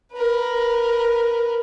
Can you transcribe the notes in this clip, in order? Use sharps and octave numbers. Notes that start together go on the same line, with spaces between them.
A#4 B4